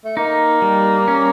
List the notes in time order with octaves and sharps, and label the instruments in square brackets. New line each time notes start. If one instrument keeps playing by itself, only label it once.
[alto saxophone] A3
[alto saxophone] A#3 [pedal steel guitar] D#4
[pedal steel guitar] G3
C#4